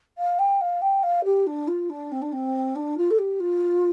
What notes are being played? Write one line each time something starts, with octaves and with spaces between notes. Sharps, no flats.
F5
G5
F5
G5
F5
G4
D4
F4
D4
C4
D4
C4
D4
F4
A4
G4
F4